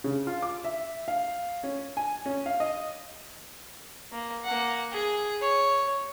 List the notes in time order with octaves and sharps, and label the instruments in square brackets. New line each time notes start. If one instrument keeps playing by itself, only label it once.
[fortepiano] C#3
F4
D6
E5
F5
C#4
G#5
C#4
F5
D#5
[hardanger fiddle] A#3
A#3 F#5
G#4
C#5